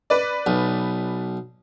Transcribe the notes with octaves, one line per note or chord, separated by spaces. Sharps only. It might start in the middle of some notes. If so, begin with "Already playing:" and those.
B4 D5
B1